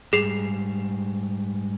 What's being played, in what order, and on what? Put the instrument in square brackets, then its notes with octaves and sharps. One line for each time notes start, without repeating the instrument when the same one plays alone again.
[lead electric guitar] G#2 G3 [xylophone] G#4 C7 F7